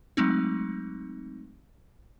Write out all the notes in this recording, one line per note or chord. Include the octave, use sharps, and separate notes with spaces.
F#3 G#3 A3 C4 D#4